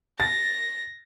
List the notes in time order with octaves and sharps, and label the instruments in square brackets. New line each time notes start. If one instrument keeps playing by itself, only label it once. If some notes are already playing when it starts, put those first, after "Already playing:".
[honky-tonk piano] A6 [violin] A#6